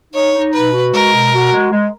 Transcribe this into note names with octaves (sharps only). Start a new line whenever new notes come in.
D#4 C#5
D#4
B2 B4
F#4
G#3 A#4
B2
F#4
G#3
G#3